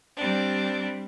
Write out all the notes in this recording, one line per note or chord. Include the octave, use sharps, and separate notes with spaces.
G3 C4 D4